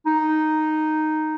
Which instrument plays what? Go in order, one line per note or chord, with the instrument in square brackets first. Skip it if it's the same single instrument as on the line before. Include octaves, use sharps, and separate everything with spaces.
[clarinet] D#4